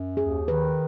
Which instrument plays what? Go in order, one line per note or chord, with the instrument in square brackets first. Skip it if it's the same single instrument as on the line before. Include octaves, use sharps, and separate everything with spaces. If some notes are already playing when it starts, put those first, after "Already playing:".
Already playing: [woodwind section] F#2
[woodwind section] D#2 [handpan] G#4
[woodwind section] D#3 [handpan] B4